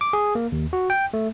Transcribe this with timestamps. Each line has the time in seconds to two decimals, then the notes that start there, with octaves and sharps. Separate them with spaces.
0.01 D6
0.13 G#4
0.35 A#3
0.52 D#2
0.73 F#4
0.90 G5
1.13 A3